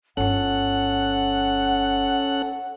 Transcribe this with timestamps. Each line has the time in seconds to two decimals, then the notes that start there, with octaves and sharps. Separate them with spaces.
0.17 G1 C#4 F4 A4 F#5 F#6